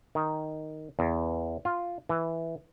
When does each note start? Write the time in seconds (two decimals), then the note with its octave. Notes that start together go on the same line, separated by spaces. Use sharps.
0.15 D#3
0.99 E2
1.65 F4
2.09 E3